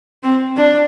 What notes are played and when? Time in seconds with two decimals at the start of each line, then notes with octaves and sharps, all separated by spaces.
0.23 C4
0.57 D4